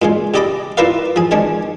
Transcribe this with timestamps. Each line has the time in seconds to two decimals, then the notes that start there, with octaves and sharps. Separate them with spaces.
0.02 A#2 C#3 G#3
0.34 C#3 G4 D5 D#5 B5 D6
0.77 E4 F4 A#4 B4 D5 F5
1.16 F3 G#4
1.31 D#3 G#3 C#4 D4